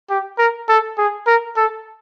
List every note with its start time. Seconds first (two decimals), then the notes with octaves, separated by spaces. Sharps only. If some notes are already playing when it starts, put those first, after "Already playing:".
0.10 G4
0.38 A#4
0.69 A4
0.98 G#4
1.27 A#4
1.57 A4